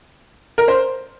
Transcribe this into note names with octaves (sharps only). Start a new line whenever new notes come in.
A#4
C5